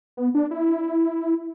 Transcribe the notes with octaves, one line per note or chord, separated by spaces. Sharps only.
B3
D4
E4